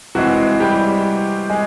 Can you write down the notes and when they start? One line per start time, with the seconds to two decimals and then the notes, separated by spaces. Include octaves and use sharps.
0.15 C3 E3 G#3 C4 F#4
0.60 G3 G4
1.50 G#3 G#4